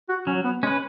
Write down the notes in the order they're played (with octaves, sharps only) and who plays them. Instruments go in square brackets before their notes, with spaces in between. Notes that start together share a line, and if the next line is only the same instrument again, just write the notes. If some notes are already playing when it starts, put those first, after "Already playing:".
[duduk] F#4
[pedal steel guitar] F#3 [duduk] C#4
[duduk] B3
[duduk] G#3 [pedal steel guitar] C#4 B4